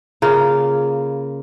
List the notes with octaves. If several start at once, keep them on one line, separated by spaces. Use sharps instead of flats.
C#3 A#3 F4